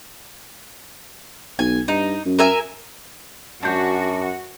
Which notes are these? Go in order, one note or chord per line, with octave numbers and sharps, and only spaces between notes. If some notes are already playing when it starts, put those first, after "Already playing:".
B1 G#5
G2 D#4
F#2
A#4 E5 G#5
F#2 D4 F#4 G6